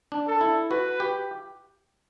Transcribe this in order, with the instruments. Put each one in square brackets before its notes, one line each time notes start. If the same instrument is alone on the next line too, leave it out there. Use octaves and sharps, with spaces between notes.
[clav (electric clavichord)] D4
[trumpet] A4
[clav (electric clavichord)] E4
[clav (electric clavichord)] F#4 [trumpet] B4
[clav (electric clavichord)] G4